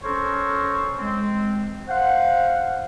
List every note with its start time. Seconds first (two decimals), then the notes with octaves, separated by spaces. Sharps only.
0.04 C#4 A4 A#4 C5 C#5
0.99 G#3 C4
1.89 C5 F5 F#5